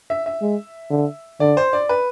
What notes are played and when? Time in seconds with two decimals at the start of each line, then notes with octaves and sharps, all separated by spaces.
0.10 E5
0.26 E5
0.42 G#3
0.91 D3
1.40 D3 D5
1.57 C5
1.73 D5
1.89 B4